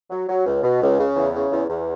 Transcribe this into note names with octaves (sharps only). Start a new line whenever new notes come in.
F#3
F#3
C#2
B2
C#2
C#3
E2
C#3
E2
E2